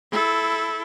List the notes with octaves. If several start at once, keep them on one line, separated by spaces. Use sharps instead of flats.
E4 A4